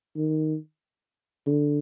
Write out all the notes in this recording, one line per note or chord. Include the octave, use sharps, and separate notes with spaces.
D#3
D3